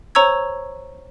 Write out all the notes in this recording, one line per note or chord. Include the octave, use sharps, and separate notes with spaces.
C5 C#5 A#5 C#6 E6 G#6